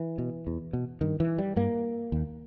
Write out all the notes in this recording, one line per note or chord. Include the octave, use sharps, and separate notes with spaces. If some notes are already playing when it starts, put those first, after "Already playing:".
Already playing: E3
B2
E2
B2
G2 D#3
E3
G3
G2 A#3
D#2